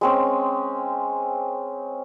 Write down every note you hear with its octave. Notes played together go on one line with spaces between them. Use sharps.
G#3 C4 C#4